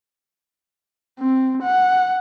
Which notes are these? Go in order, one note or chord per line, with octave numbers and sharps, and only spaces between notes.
C4
F#5